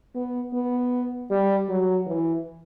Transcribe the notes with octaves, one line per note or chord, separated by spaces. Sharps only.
B3
B3
G3
F#3
E3